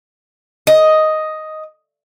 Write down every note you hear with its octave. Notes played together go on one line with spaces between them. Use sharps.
D#5